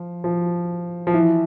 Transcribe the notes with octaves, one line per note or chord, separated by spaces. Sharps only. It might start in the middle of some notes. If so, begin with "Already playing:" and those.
Already playing: F3
F3
F3
E3